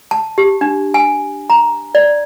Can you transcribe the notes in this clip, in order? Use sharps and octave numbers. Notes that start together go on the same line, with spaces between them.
A5
G4
D4
G#5
A#5
D5